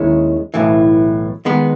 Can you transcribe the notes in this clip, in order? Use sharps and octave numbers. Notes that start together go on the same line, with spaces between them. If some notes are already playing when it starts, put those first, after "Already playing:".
Already playing: D#2 D#3 G#3 C#4 E4
B1 A2 E3
D#3 G#3 B3